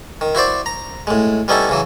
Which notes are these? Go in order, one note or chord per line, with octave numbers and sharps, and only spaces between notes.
D#3
E4 F#4 C5 D5
A#5
A2 G#3
G3 B3 C#4 D#4 E4 A4
C#3 E3 F#3